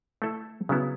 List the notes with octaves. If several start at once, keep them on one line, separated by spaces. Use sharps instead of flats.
A3 E4 A4 E5
C#3 F#3 B3 E4